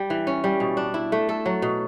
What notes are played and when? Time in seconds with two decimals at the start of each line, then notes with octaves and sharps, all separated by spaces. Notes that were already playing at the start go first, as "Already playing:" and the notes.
Already playing: G3
0.10 E3
0.27 C#4
0.44 G3
0.60 B2
0.77 D4
0.94 E4
1.12 A3
1.29 A4
1.46 F#3
1.62 B2